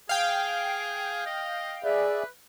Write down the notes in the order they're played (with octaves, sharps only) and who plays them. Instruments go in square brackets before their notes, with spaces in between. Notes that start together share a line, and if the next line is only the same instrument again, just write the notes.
[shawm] G#4 [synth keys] F5 G5
[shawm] D#5
[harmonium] G#4 D5 E5 [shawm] B4